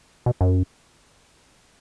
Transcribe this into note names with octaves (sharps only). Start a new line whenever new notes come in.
B2
F#2